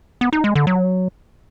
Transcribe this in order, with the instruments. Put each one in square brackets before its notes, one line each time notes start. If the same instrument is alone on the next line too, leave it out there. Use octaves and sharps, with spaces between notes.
[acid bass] B3
D#4
G#3
D3
F#3